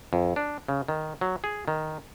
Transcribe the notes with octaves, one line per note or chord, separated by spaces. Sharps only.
F2
D4
C#3
D#3
F#3
G#4
D#3